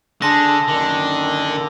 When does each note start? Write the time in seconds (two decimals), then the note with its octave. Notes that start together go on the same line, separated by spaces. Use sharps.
0.22 D3 D4 G#4 A5 C6 A#6
0.69 F#2 A#2 D3 D#3